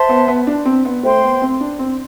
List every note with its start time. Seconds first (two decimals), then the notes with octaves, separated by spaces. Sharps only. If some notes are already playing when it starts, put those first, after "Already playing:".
Already playing: C5 E5 A5 C6
0.09 B3
0.28 B3
0.47 D4
0.65 C4
0.85 B3
1.03 A3 C5 G5 C6
1.23 B3
1.42 C4
1.61 D4
1.79 C4